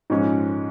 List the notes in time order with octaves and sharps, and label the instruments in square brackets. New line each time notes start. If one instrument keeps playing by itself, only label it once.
[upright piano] G#2 F3 G#3 C#4